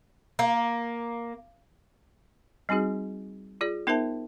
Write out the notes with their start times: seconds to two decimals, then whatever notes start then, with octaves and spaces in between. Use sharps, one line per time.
0.39 A#3
2.69 G3 C4 D#4 F#4 G#4
3.61 F4 G#4 D5
3.87 B3 D#4 A#4 C5 E5 A5